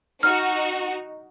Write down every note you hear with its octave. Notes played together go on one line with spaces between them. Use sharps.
D#4 F#4 F6